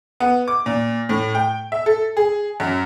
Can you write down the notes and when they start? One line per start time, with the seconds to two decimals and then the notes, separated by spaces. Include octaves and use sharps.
0.20 B3
0.48 D6
0.66 A#2
1.09 A2
1.35 G5
1.72 E5
1.86 A4
2.17 G#4
2.60 F#2